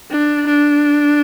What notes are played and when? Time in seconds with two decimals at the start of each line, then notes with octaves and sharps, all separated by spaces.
0.11 D4
0.47 D4